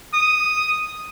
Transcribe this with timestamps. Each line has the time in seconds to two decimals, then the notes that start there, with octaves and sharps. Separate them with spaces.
0.14 D#6